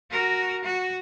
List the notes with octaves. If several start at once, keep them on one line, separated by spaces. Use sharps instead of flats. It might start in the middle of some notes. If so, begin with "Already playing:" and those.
F#4 A#4
F#4